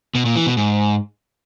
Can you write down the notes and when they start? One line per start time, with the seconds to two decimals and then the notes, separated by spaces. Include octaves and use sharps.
0.15 B2
0.25 A#2
0.36 E3
0.46 B2
0.57 G#2